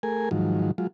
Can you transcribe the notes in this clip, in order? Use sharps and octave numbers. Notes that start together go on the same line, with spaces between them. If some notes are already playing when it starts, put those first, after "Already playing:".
A3 G#4 A#4 G#5
G#2 D#3 F3 F#3
F#3 G#3 F4